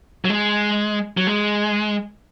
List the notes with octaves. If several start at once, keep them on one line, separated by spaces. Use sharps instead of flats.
F#3
G#3
F#3
G#3